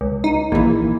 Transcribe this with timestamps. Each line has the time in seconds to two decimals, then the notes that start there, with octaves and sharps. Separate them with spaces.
0.01 C#2
0.24 D#4
0.52 A#1 A#2 E3